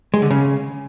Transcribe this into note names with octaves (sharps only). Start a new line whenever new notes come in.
G#3
D3
C#3